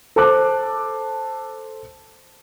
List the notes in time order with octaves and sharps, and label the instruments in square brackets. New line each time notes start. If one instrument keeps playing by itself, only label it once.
[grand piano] A4 C5 A5 D6 F#6